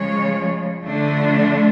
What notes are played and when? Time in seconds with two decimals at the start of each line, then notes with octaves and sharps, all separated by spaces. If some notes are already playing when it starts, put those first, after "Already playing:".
Already playing: C#3 F3 G#3 C#5
0.86 D3 F3 A3 D4